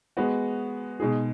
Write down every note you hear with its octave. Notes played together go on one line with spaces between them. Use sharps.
G#3 B3 F#4
B2 G#3 D#4 G#4